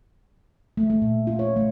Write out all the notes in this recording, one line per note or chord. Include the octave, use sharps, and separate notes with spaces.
A3
A3
A#2
F4
C#5
A3